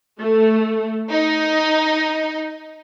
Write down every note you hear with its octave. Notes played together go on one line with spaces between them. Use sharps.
A3
D#4